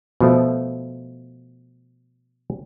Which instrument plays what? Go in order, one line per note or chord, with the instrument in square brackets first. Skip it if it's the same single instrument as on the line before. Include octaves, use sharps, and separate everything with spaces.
[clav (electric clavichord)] B2 F3 A3